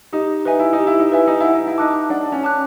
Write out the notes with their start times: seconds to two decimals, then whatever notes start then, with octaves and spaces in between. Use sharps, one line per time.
0.13 D#4 G4
0.45 D#4 B4 E5 G#5
0.59 E4
0.73 D#4
0.79 G4
0.87 E4
1.00 D#4
1.12 E4 B4 E5 G#5
1.27 D#4
1.40 E4 F#5
1.54 D#4
1.67 E4
1.78 D#4 A5 D6 F#6
2.10 D4 F#5
2.32 C#4
2.43 A5 D6 F#6